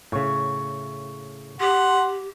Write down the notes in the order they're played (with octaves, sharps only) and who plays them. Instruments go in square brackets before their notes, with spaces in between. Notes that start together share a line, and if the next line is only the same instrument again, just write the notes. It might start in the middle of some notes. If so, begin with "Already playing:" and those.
[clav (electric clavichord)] A2 C#3 [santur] C#6
[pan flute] G4 [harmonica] F#5 C6